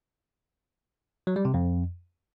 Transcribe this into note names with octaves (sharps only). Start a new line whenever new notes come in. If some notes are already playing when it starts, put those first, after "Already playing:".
F#3
G3
C3
F2